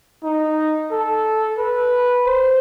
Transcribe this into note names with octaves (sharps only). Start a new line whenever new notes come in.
D#4
A4
B4
C5